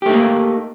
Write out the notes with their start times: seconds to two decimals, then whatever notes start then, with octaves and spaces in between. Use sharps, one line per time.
0.02 G4
0.06 A3
0.10 D#4
0.13 A#3